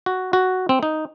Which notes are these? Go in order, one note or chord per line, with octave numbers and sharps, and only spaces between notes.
F#4
F#4
C4
D#4